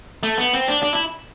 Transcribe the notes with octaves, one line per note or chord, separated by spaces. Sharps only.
A3
B3
C4
D4
D4
E4